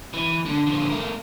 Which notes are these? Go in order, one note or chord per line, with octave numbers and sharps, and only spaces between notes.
E3
D3
D3 F3
A3 A#4